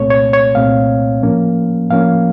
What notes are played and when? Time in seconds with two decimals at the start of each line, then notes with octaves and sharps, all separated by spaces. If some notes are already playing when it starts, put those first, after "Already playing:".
Already playing: C2 A#2 A3 C4 C#5
0.10 C#5
0.33 C#5
0.55 C2 A#2 A3 C4 F5
1.22 A2 F3 A#3 C#4
1.89 A2 F3 A#3 C#4 F5